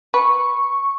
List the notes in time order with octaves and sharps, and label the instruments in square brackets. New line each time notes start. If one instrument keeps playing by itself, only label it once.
[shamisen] B4 [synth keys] C#6